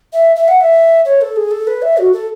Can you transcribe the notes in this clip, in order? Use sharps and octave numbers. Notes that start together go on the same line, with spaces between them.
E5
E5
F#5
E5
C#5
A4
G#4
A4
B4
E5
F#4
A4